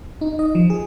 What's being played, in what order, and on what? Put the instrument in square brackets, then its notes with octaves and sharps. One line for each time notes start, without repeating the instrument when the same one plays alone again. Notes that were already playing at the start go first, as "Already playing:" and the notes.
[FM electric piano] D#4
D#5
F3
G#4